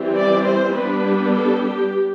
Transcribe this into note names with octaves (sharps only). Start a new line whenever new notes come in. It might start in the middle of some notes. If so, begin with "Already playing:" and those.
Already playing: E3 G3 C4
D5
C5
G3 B3 D4 B4
A4
G4